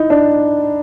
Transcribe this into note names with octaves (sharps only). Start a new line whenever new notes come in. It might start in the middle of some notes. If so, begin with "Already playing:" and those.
Already playing: D#4 E4
D4